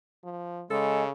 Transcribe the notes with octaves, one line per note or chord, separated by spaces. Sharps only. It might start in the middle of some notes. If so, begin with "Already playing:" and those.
F3
C#3 G#3 A4